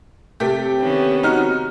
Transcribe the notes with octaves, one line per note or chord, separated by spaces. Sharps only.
C3 A3 G4
D#3 B3 C#4
D#4 F#4 F6